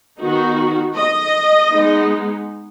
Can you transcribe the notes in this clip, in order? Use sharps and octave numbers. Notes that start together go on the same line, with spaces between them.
D#3 B3 D#4 F#4
D#5
G#3 B3 D#4